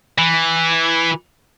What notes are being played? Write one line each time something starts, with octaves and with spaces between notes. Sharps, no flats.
E3